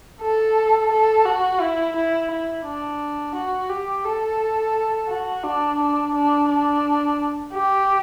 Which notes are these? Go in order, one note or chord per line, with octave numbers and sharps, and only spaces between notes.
A4
A4
F#4
E4
E4
E4
D4
F#4
G4
A4
F#4
D4
D4
D4
D4
G4